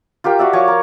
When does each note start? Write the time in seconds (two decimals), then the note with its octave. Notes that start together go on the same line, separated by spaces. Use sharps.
0.24 F4 G4 A#4 G5
0.39 F#4 D5 E5
0.53 F3 C#5 C#6 D6
0.68 A#4